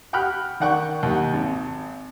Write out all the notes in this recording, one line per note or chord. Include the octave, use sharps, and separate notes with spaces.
F#5 G5 B5 F6 F#6
D#3 D5 F#5 G5 C#6
D#2 D#4 F#5
G#1